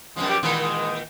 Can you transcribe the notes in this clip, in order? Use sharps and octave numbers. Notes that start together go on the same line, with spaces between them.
F#2 B2 F3 G#3
G4
A#2 D#3 E3 G#3
G#3